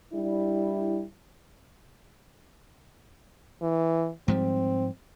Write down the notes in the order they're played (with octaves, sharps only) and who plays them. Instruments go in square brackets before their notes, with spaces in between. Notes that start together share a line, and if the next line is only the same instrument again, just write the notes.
[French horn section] G3 D4 E4
[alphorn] E3
[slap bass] G#2 F3 G3 [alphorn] C4